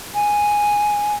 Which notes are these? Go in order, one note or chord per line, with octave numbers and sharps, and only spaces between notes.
G#5